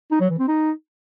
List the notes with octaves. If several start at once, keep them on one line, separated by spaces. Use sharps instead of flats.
D#4
F#3
E3
C4
D#4